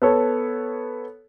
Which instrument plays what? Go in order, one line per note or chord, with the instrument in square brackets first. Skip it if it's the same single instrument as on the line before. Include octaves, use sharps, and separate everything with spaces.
[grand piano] B3 A4 C#5